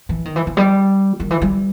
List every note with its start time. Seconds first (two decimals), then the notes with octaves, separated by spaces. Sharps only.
0.09 E3
0.25 D#3
0.36 E3
0.47 E3
0.57 G3
1.20 D#3
1.31 E3
1.42 G3